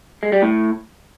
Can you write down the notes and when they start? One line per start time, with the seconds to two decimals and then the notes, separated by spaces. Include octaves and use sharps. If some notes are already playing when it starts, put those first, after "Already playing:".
0.23 G#3
0.32 G3
0.42 A2